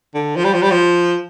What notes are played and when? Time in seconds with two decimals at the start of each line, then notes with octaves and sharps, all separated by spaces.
0.15 D3
0.36 F3
0.44 G3
0.54 F3
0.62 G3
0.71 F3